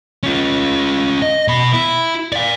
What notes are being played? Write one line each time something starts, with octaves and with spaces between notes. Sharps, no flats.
C#4 F4
D#5
B2 B5
E4
D5 F5